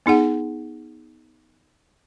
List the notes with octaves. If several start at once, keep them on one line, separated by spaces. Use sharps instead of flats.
B3 D#4 G#4 F#5